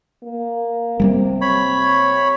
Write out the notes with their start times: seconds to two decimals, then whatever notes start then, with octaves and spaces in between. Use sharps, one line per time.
0.23 A#3
1.00 C3 G3 A3 A#3
1.41 C#5 B5